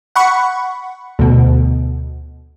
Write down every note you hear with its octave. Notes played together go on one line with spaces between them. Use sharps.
F#5 B5 C#6
D2 B2